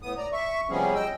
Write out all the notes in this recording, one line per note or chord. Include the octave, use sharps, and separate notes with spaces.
A2 B3 D#6
D5 A#5
E5 C#6
C3 F3 G3 B3 C#4 G#4
D#5 G5 E6